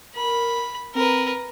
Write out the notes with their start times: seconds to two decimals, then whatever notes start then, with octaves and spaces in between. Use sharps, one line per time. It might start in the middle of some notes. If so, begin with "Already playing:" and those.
0.16 A#4 B5
0.95 C4 A#4 B4